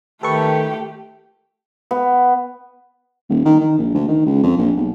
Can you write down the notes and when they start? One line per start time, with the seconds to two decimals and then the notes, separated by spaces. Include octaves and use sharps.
0.23 D#3 A3 G4 A4 B4 C#6
1.91 B3
3.29 D#1
3.45 D#3
3.60 D#3
3.78 A#1
3.94 D2
4.08 D#3
4.26 C#2
4.43 F2
4.57 A#1
4.77 B1